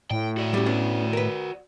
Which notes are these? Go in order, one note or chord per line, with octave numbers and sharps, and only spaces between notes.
A2 G5
F#4 D5
G3 C#4
B3 C#4 D4
A#4 B4